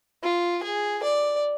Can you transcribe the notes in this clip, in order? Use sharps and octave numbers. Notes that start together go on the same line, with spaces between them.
F4
G#4
D5